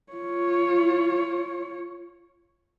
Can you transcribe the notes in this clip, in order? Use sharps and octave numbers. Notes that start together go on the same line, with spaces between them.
F4 C#5